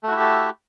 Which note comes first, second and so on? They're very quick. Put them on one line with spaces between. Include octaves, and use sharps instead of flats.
A3 F#4 E4 G4 A4